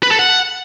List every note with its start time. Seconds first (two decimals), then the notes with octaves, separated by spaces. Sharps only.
0.03 B4
0.11 A4
0.19 F#5